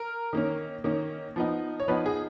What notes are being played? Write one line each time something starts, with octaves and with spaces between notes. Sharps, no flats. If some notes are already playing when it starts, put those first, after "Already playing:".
Already playing: A#4
D#3 A#3 C#4
D#3 A#3 C#4
F3 B3 D#4
C#5
F3 B3 D#4 B4
G#4